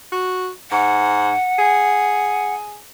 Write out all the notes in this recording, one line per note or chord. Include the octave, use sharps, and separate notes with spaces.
F#4
G#2 F#5
G#4